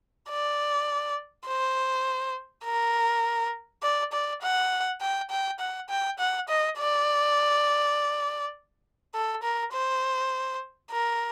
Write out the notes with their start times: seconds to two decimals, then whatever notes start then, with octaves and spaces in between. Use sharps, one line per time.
0.29 D5
1.47 C5
2.65 A#4
3.83 D5
4.12 D5
4.43 F#5
5.01 G5
5.30 G5
5.59 F#5
5.89 G5
6.19 F#5
6.49 D#5
6.78 D5
9.14 A4
9.43 A#4
9.73 C5
10.91 A#4